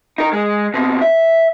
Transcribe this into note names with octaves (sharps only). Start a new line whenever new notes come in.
D#4 A#4
G#3
B2 C4
E5